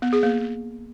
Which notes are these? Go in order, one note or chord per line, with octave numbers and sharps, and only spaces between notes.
B3
G#4
A#3